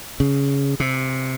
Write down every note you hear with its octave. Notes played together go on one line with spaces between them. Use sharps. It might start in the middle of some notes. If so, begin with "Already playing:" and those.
C#3
C3